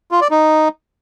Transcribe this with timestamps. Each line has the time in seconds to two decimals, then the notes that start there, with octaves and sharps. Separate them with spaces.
0.11 F4
0.21 D5
0.31 D#4